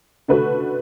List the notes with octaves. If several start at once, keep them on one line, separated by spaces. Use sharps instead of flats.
D3 A3 F#4 B4